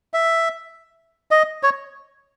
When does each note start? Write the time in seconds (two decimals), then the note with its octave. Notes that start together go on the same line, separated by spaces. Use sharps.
0.14 E5
1.31 D#5
1.63 C#5